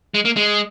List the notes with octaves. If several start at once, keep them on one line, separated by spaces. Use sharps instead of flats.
G#3
A#3
G#3